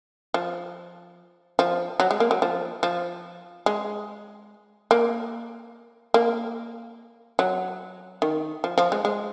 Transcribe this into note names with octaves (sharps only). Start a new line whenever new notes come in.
F3
F3
F#3
G#3
A#3
F#3
F3
F3
G#3
A#3
A#3
F#3
D#3
F3
F3
G#3
G#3